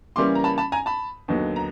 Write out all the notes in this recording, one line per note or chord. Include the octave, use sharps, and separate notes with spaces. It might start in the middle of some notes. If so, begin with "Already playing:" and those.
C#3 E3 G3 A#3 C#4 C6 D6
A#5
A5 B5
A5 B5
G#5 A#5
A5 B5
D#2 D3 F#3 B3 D#4
A#5